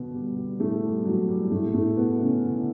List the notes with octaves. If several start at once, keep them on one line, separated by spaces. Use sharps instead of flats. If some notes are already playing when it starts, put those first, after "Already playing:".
Already playing: B2 D3 B3 D4
G3
G3
A2 A3
G3
F#3
G3
A2 A3
A2 A3
B2 B3
C#3 C#4
D3 D4